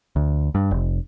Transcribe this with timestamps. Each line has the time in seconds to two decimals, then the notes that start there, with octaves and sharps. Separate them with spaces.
0.16 D2
0.55 G2
0.71 F1